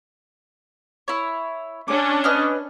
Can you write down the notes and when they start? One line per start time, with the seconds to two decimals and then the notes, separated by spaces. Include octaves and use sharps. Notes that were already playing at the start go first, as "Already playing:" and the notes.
1.08 E4 C#5
1.88 C#4 D4 D6
2.24 B4 D#5 F6